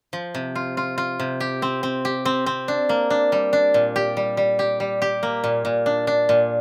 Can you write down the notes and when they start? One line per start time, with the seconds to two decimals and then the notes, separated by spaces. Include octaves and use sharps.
0.13 F3
0.34 C3
0.55 F4
0.77 F4
0.98 F4
1.19 C3
1.40 G4
1.62 C4
1.83 C4
2.05 G4
2.25 C4
2.46 C4
2.68 D4
2.89 A#3
3.10 D4
3.32 G3
3.53 D4
3.74 A#2
3.96 G4
4.17 G3
4.37 G3
4.59 G4
4.80 G3
5.02 G4
5.23 A#3
5.44 A#2
5.65 A#2
5.86 D4
6.07 D4
6.29 A#2